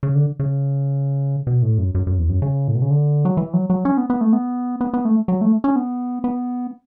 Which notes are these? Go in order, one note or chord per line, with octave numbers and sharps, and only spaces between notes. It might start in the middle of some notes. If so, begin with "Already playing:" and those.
C#3
D3
C#3
B2
A2
F#2
F#2
F#2
E2
F#2
C#3
A2
B2
C#3
D3
F#3
E3
F#3
F#3
C#4
B3
B3
A3
B3
B3
B3
A3
F#3
A3
C#4
B3
B3